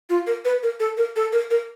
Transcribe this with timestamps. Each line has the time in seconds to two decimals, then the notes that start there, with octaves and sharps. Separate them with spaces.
0.10 F4
0.27 A#4
0.45 B4
0.63 A#4
0.80 A4
0.97 A#4
1.16 A4
1.32 A#4
1.51 A#4